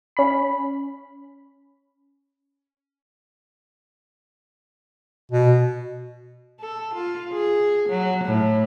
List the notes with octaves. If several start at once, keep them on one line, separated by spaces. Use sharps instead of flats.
C#4 B5
B2
A4
F4
G#4
F#3
A2